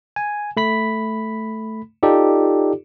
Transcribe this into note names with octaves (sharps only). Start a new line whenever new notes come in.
G#5
A3 B5 B6
D#4 F4 G4 A4 D5